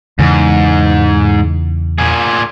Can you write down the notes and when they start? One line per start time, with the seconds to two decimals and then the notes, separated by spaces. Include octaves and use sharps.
0.19 E2 G#2 C#3 E3
1.98 A#2 G#4